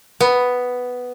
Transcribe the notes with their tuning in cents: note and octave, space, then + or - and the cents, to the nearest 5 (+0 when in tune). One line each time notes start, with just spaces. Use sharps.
B3 +5